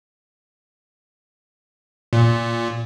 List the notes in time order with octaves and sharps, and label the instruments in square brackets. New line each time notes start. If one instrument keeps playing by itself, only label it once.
[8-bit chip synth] A#2